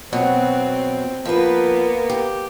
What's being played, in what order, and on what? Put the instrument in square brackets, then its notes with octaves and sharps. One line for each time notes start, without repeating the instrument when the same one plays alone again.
[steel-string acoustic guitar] B2 F#3 B3 [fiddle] C4
[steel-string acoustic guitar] F3 B4 [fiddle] A#3 B3
[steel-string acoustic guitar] G4